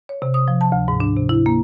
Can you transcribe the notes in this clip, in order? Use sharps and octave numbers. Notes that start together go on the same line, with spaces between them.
C#5
C3
D#6
F3
A5
D2
G#2
D4
C3
E4
A#3